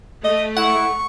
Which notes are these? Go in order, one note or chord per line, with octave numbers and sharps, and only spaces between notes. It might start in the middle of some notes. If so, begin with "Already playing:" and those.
A3 D#5
E4 F#5 C#6